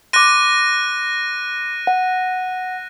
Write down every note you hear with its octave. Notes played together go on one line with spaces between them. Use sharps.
C6 D6 F#6 A#6 D#7
F#5